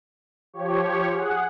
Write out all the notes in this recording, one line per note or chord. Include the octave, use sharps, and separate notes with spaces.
F3 G4 C#5
G#4 F#5